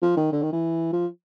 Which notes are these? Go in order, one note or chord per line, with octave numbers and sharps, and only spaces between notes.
F3
D#3
D3
D#3
E3
F3